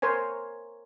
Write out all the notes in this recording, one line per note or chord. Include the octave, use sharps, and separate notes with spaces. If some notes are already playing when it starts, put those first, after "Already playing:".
A#4 C5 C#5 G#5